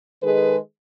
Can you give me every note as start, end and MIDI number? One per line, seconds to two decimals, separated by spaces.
0.23 0.56 51
0.23 0.56 56
0.23 0.56 68
0.23 0.56 69
0.23 0.56 71